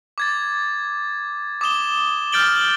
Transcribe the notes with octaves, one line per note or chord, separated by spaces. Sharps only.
D6 G#6 A6
D6 D#6 E7 G7
F6 G6 A6 D7 F#7 G7